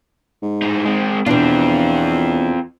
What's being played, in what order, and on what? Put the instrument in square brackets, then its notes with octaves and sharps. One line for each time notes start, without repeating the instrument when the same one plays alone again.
[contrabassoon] G#2
[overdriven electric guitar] A2 D#4
G#3 C4
[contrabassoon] E2 [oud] B2 D4 [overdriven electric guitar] C4 F4